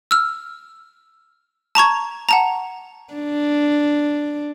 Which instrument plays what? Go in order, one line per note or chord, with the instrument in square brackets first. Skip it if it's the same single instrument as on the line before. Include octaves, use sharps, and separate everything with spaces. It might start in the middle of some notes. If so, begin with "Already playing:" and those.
[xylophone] E6 F6
A5 A#5 C#6 G#6
F#5 A5 A#5
[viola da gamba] D4